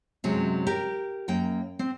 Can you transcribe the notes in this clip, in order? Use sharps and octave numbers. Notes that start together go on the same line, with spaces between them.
F#2 C3 F#3 G#3 C#4
G4 A#4
F#2 A#3 G5
C4